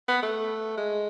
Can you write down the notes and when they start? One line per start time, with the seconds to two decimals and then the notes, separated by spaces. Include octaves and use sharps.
0.09 B3
0.22 A3
0.78 G#3